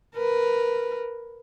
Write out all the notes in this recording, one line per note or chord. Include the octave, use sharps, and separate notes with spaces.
A#4 B4